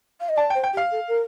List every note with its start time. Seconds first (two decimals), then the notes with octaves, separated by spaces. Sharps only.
0.20 F5
0.29 D#5
0.36 D5 A5
0.50 G5
0.55 C5
0.63 G5
0.73 G4
0.77 F5
0.91 A4
1.07 A#4